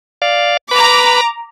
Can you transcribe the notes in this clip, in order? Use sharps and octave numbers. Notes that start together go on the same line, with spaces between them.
D5 F5
B4 A#5 B5 D6